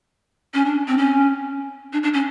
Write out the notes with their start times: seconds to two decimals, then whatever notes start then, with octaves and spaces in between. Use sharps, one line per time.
0.54 C#4
0.65 D4
0.88 C4
0.97 C#4
1.93 D4
2.03 D4
2.14 C#4